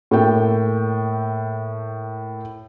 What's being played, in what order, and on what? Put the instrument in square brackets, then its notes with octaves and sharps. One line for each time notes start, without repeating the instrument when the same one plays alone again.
[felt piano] A2 A#3 A4 G5